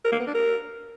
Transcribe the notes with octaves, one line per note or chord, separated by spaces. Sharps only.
A#4
A#3
B3
D4
A#4